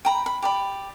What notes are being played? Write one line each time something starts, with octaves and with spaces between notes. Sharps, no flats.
G5 A#5 B5
B5
G4 D5 B5